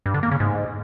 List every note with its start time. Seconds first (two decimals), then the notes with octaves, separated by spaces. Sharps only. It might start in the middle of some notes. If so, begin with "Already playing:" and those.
0.06 G2
0.14 D3
0.23 A#3
0.31 C#3
0.40 G#2